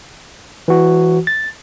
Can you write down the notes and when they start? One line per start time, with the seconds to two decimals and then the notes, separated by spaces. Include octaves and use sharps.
0.68 E3 F#4
1.27 A6